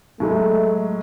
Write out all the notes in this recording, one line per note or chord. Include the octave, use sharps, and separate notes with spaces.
A2 F#3 G#3 A3